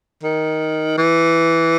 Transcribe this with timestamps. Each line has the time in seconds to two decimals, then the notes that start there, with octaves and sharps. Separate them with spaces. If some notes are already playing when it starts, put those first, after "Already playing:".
0.24 D#3
0.98 E3